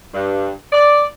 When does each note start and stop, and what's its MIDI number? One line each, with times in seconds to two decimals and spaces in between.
0.13 0.50 43
0.72 1.03 74